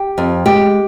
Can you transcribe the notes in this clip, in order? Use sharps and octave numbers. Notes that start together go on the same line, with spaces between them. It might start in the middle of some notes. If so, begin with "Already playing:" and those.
Already playing: G4
F2
G#3 G4